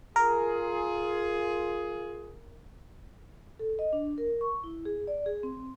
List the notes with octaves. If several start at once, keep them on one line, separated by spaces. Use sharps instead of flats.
F4 G#4 A#4
A4
D#5
D4
A#4
C#6
E4
G#4
D5
G#4
C4